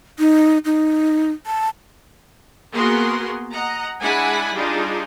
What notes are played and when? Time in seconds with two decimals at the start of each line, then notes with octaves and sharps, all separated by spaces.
0.19 D#4
0.65 D#4
1.46 A5
2.73 A#3 B3 F#4 G#4 A#4 C6
3.52 D#5 F#5 A#5
4.01 G#3 D4 E4 F#5 G#5 B5
4.53 G3 D4 D#4 F4 G#4